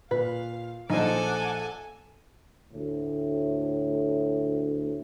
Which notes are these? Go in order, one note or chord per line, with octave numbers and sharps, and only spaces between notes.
A#2 B4 F5
A#1 D#4 A4 C5 F#5 G#5 A5 D6
D2 A2